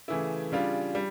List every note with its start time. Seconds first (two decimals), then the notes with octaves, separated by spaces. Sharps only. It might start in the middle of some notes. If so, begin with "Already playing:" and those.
0.08 C#3 E3 A3 E4
0.52 C#3 G3 D4 F4
0.95 G3